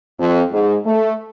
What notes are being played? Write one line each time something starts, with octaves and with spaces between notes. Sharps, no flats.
F2
G#2
A3